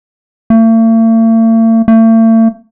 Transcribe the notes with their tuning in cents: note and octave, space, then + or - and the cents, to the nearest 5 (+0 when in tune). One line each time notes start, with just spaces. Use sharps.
A3 +45
A3 +40